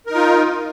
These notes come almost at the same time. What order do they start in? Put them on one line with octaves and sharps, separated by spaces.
A#4 D#4 F4